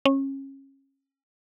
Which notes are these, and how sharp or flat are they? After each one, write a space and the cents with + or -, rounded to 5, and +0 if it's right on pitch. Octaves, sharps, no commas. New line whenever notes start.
C#4 -30